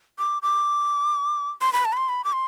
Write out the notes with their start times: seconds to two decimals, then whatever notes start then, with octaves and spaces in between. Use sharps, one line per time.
0.19 D6
0.42 D6
1.62 C6
1.73 B5
1.85 A5
1.93 B5
1.97 C6
2.09 B5
2.24 D6
2.33 C6